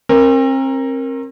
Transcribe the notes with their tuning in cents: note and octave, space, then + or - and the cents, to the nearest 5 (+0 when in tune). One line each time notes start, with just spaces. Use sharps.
C4 +40 A#4 +0